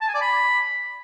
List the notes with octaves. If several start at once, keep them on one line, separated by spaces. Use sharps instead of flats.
A5
G#5
D5
B5